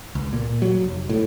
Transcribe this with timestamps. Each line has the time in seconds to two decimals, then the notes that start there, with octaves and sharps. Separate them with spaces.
0.15 C#2
0.33 A#2
0.62 F#3
0.84 F1
1.10 A2